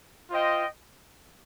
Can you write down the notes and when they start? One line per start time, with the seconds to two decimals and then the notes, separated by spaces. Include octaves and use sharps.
0.30 F4 C5 D#5 G5